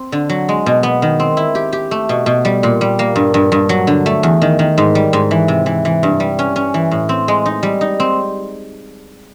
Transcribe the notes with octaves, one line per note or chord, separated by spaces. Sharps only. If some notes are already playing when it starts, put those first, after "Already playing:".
Already playing: C4
D3
F#3
G#3
B2
B3
D#3
C4
E4
G4
G4
A3
B2
B2
G3
A#2
G3
A#3
G2
G2
G2
F#3
D3
A3
E2
D#3
D#3
G#2
G3
G#2
E3
C3
E3
E3
G2
G3
C#4
C#4
E3
A2
C4
G#3
D#4
G3
D#4
C4